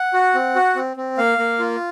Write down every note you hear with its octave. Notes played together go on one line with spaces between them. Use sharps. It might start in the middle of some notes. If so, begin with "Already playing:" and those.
Already playing: F#5
F#4
C4
F#4
C4
C4
A#3 F5
A#3
F4